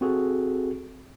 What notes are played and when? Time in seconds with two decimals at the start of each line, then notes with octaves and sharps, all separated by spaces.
0.01 C4 F#4 G#4 A4